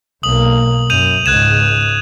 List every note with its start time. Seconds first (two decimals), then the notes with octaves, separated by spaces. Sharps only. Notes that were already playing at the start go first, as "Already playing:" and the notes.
0.23 B1 A#3 D#6 F#7
0.90 F#2 G6 D#7 F7
1.26 C#2 G#2 F#6 G#6 E7